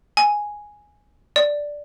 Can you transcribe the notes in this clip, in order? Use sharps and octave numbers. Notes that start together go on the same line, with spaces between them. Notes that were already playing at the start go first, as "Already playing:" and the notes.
G#5
D5